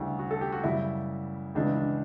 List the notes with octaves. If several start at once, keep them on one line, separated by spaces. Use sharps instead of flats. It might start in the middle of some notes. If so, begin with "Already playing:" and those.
Already playing: D2 C#3 G3 E4
F#4
A4
G4
F#4
F#2 C#3 G3 E4
C#2 C#3 E3 D4
D4